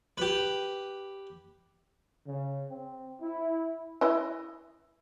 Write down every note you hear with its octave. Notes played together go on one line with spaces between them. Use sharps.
G4 B4
C#3
C4
E4
E4 B4 D#5